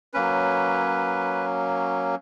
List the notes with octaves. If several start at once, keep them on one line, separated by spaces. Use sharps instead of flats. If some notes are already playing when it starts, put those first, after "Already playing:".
F#3 A#3 C#4 B4